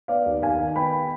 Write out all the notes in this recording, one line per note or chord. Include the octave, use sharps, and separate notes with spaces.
B3 D5 F5
D#2
D#2 F5 G#5
D#3
B3 G5 B5